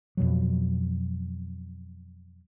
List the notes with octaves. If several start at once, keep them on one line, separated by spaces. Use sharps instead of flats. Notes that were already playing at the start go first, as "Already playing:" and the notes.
F2 B2 F#3